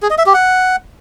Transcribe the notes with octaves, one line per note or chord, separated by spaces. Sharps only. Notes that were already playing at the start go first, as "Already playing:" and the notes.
G#4
D#5
E5
G4
F#5